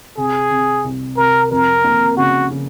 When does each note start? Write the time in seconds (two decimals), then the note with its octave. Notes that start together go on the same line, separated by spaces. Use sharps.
0.17 C3 G#4
0.50 C3
0.84 C2
1.17 C3 A#4
1.51 F2 A#4
1.84 A#3
2.17 C#3 F#4
2.51 C#3